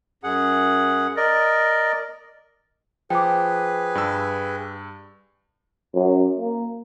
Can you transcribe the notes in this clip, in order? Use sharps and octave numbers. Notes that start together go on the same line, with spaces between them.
F#2 G#4 F#5
A#4 D5 D#5
F3 G#4 B4 G5 D6
G2 E6
F#2
A#3